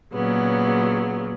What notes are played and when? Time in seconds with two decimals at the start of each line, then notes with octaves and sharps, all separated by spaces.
0.13 A#2 C#3 F#3 B3